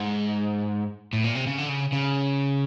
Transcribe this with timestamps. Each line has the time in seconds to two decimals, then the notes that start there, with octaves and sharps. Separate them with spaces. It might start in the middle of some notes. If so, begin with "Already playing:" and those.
Already playing: G#2
1.13 A2
1.24 A#2
1.35 C3
1.47 C#3
1.58 D3
1.69 C#3
1.92 C#3